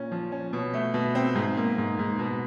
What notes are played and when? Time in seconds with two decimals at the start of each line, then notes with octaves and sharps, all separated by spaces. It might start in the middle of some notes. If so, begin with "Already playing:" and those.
Already playing: A#2 C#4
0.12 F3
0.32 C#4
0.53 B2
0.74 A3
0.94 B2
1.15 C4
1.35 G#2
1.57 A#3
1.78 G#2
1.99 G#2
2.19 B2